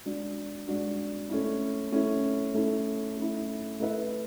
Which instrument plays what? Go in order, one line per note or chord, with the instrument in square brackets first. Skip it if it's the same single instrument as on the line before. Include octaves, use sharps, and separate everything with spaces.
[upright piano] G#3 D4 F#4
G#3 D4 F#4
A3 C#4 E4
A3 C#4 E4
A3 C#4 E4
A3 C#4 E4
A3 E4 B4 E5